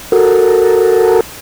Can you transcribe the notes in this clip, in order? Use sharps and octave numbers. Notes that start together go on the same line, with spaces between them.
F#4 A4 A#4